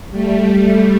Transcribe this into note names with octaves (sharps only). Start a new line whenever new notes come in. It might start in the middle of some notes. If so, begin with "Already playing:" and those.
G3 A3